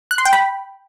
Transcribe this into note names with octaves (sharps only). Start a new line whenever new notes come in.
F#6
C6
G5
B5